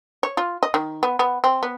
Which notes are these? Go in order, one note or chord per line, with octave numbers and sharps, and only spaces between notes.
C#5
F4
D#5
D#3
B3
B3
C4
B3